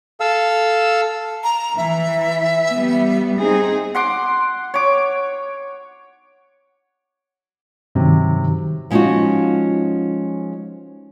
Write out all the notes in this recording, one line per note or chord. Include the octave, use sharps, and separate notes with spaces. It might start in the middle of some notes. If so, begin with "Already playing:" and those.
A4 F5 E6
A#5
E3 E5
G3 B3
C4 D#4 G#4
F#5 C6 D6
C#5 D6
G2 C3 D#3 F#3
F3 G#3 C#4 D#4 F4 F#4